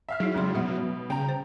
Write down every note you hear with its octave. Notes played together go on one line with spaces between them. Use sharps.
E5 F5 F6
F#3 D#4 E4 G#4
F2 C#3 G3 G#3 F5 C6
B2 G3 E5 F#5
C#3 G5 A#5
C5